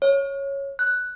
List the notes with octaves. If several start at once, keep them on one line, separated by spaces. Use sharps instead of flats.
C#5
F#6